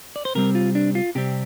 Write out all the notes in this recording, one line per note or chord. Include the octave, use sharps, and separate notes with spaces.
D5
C5
C3 G3 C4 A#4
F4
D4
F4
C3 G3 C4 G4